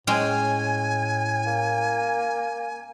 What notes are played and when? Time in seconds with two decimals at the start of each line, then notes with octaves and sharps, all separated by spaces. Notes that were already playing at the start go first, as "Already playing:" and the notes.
0.07 A2 G#3 C#4 G5 G#5
1.46 A#3